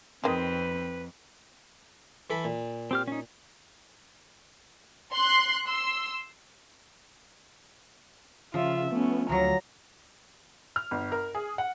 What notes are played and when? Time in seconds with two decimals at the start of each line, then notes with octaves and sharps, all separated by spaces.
0.24 F2 D#3 G#3 C4 B4
2.30 E3 A4 B5
2.44 A#2
2.91 C4 G4 F6
3.08 C#4 D#4
5.13 C6 F#6
5.68 C6 E6
8.54 C#3 F3 F4 E5
8.92 A3 B3 C#4
9.29 D2 F3 F#3 A#5 A#6
10.76 F6
10.91 G1
11.12 A#4
11.35 G#4
11.58 F#5